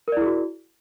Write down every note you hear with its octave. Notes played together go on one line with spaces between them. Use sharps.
E4 F#4 G#4 A#4 D5